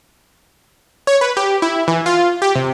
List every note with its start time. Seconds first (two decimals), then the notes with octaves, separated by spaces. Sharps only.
1.07 C#5
1.21 B4
1.37 G4
1.62 E4
1.88 E3
2.06 F4
2.42 G4
2.55 C3